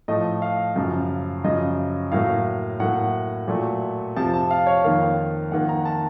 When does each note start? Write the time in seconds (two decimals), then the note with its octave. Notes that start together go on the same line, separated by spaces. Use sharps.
0.08 A2 F3 A3 D#5
0.42 F5
0.76 F#2 C#3 F3
1.44 F#2 C#3 F3 D#5
2.12 A2 F#3 A#3 F5
2.80 A2 F#3 A#3 F#5
3.48 A#2 F#3 A3
4.16 F2 C3 F3 A5
4.34 A5
4.51 F5
4.67 C#5
4.84 F2 D#3 A#3 F5
5.52 F2 D#3 A#3 F#5
5.69 A#5
5.85 A5